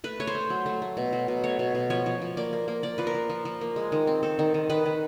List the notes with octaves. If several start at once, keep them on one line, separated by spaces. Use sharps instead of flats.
A3 B4
A3 C#5
C5
A3
F#3
A3
A3
B2
F#3
B2
A3 C#5
B2
B2
F3 C#5
F3
F3
A#3 D5
A#3
A#3
A#3 D5
F3 B4
A#4
F3
F3
F3
A#3
G#3
D#3
C4
C4 A4
D#3
D#3
D#3 B4
D#3